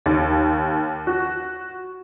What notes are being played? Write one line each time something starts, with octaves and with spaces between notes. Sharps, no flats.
D#2
F#4